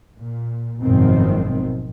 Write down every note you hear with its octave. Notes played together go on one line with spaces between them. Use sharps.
A#2
G#1 F#2 B2 D#3 F3 C4